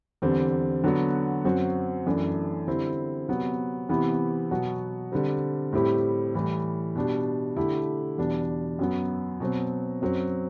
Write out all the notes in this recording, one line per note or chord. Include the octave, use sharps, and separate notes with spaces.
E2 D3 G3 C4
D3 F#3 B3 F#4
F#2 F#3 C4 F#4
F#2 E3 A3 D4
D3 G3 C4 E4
C3 F#3 B3
C3 E3 B3 E4 G4
B2 F#3 B3 F#4
D3 G3 C4
A2 G3 C4 E4 G4
A2 E3 G3
B2 G3 D4 G4
D3 A3 E4 G4
E2 B2 G3 D4
F#2 F#3 B3
B2 F#3 C4
F#2 F#3 C4